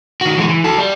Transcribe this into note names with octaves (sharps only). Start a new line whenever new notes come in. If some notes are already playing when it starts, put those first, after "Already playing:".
D#3 F#4
E3 G#3
E3
F#4 A4
G3